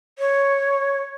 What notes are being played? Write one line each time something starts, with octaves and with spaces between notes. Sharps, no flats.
C#5